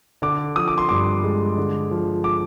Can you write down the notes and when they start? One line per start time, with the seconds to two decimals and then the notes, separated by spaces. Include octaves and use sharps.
0.22 D3 D6
0.56 F3 D#6
0.68 D6
0.78 C6
0.89 G2 D6
1.24 G#3
1.57 D3
1.91 F3
2.24 D6